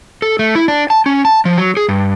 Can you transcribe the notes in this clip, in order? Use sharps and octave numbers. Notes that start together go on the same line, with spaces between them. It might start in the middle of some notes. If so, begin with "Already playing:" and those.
A4
A3
E4
D4
A5
C#4
A5
F3
F#3
G#4
G2